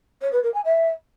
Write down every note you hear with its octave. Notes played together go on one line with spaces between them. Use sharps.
C#5
B4
A#4
G#5
E5